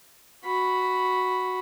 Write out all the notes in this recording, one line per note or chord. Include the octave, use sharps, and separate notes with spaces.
F#4 B5